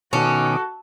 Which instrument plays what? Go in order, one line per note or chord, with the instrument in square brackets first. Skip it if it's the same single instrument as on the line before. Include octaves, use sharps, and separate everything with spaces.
[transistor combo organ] B2 D#3 D6 [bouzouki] C#4 [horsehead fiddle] F#4 [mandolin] A4